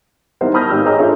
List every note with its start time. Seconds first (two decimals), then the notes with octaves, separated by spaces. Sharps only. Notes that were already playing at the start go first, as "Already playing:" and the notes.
0.41 D#3 G3 B3 E4 A#4 C5
0.54 A5 B5 D#6 F6 G6 A#6
0.69 G#1 G#2 G4 E6
0.85 G#4 A#4 C#5 D#5 A#5 D#6
0.99 D4 F4 A4 A#4 C#5 E5